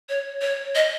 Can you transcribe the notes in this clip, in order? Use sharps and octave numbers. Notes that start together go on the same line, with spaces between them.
C#5
C#5
D#5